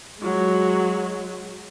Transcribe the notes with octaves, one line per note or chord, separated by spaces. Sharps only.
F#3 G#3